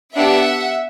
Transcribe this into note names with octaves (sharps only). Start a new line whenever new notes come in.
B3 D4 G4 E5 F#5